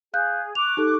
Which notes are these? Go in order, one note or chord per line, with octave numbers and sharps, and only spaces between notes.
G#4 F5 F#6 G6
C#6 D6 F#6 F7
D#4 G4 A4